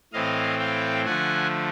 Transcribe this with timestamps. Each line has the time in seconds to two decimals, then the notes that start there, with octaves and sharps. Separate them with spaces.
0.13 A2 E3 A3 C4 D#5 F5
0.59 F5 G5
1.05 D3 F3 A3 F#5 G#5